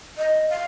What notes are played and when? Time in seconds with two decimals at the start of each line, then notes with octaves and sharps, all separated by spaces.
0.18 D#5
0.50 F5